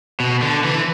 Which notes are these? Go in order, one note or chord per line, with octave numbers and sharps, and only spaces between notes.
B2
D3
E3